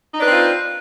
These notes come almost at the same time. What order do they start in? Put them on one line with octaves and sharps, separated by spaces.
D#4 D4 B4 C4 F4